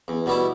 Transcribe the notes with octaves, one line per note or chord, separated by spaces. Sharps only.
E2
B2 G3 B3 E4